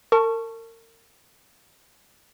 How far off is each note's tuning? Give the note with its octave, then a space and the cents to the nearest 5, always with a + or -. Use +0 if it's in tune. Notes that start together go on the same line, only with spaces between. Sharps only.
A#4 -35 A5 +0 C#6 +0